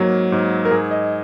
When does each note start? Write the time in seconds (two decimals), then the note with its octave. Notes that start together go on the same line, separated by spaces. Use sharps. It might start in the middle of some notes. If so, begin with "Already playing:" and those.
Already playing: G#2 F#3 A#3
0.32 G#2
0.65 A#4
0.71 G#2 G#4
0.91 D#5